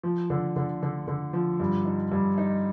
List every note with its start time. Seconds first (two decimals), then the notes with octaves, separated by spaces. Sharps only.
0.03 F3
0.30 D3
0.56 D3
0.83 D3
1.08 D3
1.33 F3
1.60 G2
1.85 D#4
2.12 G2
2.38 D#4